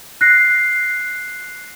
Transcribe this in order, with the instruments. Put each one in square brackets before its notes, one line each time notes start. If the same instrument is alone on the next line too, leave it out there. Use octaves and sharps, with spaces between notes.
[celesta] F#6 A#6 C7